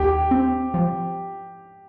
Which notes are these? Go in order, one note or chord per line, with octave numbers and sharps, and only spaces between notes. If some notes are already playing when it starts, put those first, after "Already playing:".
Already playing: D#2 G4
C4
F3